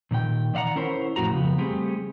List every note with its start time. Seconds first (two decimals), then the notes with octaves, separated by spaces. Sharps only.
0.11 A#2 D#3 A#4 G5
0.54 D#3 D5 F5 F#5 A#5
0.76 C#4 E4 A#4 C5 C#5
1.16 F2 A2 F#4 A#5
1.29 F2 C#3 B3
1.58 G3 A3 C4 G4 G#4